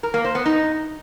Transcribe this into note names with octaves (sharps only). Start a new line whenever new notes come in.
A#4
A#3
C5
B3
D#4